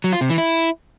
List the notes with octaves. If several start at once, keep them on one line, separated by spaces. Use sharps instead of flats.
F#3
F4
C3
E3
E4